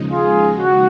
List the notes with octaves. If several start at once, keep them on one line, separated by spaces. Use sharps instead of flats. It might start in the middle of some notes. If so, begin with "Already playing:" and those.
Already playing: D#2 C#3 F3 G#3 D#4
F4 G#4
F#4